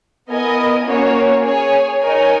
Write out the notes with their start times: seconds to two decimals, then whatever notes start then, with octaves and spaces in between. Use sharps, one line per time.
0.29 B3 E4 A#4 D#5 G#5
0.85 A#3 C#4 F#4 C#5
1.42 G#4 C#5 G#5
1.99 D#4 A#4 C#5 G#5